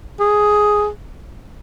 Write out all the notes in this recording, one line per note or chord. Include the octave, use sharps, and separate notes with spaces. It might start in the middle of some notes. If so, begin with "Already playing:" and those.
G#4